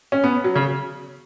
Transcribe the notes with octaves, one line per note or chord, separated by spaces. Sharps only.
C#4
B3
F#3
C#3